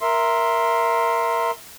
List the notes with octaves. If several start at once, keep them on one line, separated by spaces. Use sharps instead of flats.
A#4 E5 C6